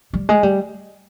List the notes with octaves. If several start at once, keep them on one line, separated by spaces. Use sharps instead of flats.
G3
G#3
G3